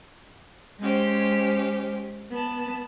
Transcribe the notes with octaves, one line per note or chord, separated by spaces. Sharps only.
G#3 C#4 G4 C5
B3 A5